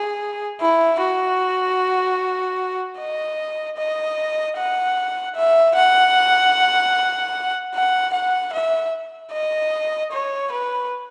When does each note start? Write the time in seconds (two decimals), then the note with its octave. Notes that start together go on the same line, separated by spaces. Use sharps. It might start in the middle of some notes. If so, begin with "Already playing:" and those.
Already playing: G#4
0.61 E4
1.00 F#4
2.98 D#5
3.78 D#5
4.58 F#5
5.36 E5
5.75 F#5
7.75 F#5
8.13 F#5
8.53 E5
9.32 D#5
10.12 C#5
10.52 B4